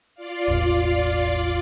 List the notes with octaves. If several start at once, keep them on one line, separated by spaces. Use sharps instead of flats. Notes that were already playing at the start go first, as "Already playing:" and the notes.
F4 D5 F5
E1 A1